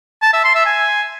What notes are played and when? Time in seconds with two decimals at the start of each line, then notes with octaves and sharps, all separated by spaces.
0.22 A5
0.33 E5
0.44 C6
0.55 E5
0.66 G#5